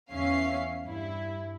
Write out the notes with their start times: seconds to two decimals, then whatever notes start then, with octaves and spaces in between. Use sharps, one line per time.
0.11 E2 C#4 E5 F5 C7
0.83 G2 E4